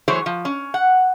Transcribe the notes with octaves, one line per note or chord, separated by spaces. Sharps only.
E3 F#3 A3 G#4 C5 C#5
F3
C#4
F#5